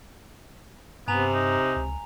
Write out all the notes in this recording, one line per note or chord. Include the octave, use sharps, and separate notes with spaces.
G2 C3 B3 G#5 A#5 F7
D#4
C#2